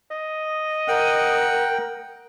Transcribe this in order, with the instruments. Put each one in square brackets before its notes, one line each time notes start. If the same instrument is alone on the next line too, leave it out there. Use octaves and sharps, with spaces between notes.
[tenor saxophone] D#5
[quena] A#4 [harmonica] F#5 [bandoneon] G5